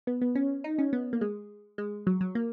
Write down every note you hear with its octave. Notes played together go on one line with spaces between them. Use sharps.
B3
B3
C#4
D#4
C#4
B3
A#3
G#3
G#3
F#3
F#3
A#3